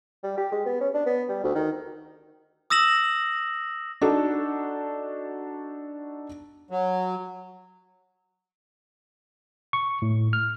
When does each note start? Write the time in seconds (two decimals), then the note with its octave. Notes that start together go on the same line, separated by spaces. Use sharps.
0.23 G3
0.37 G4
0.52 G#3
0.65 B3
0.81 C#4
0.94 D4
1.06 B3
1.29 G3
1.44 D2
1.55 D#3
2.70 D#6 E6 A#6 E7 F#7
4.01 D4 D#4 F#4 A4
6.71 F#3
9.73 C#6
10.02 A2
10.33 F6